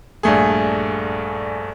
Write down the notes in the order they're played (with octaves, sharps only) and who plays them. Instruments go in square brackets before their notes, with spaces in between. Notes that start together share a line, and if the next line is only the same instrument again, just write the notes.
[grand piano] A#1 G2 A3 G#4